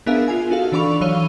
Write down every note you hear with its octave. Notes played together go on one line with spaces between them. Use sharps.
B3 D4 G#4 A#4 E5 F5
F4 G#5
D#4 F#4 A4 F5
E3 D4 D5 B5 C#6 F7
E3 F#3 C#5 F5 D#7 G7